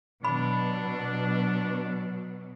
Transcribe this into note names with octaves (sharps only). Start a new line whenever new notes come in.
B2 F#3 D4 B5